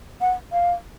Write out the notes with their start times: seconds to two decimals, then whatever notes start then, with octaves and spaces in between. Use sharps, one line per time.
0.21 F#5
0.52 F5